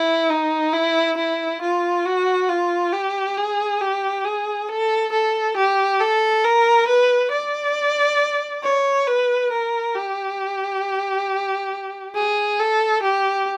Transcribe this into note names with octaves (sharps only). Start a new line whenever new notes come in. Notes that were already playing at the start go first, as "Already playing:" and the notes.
Already playing: E4
D#4
E4
E4
F4
F#4
F4
G4
G#4
G4
G#4
A4
A4
G4
A4
A#4
B4
D5
C#5
B4
A#4
G4
G#4
A4
G4